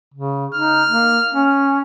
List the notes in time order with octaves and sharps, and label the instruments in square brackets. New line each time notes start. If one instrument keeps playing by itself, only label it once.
[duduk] C#3
[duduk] D#4 [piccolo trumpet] F6
[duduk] A#3
C#4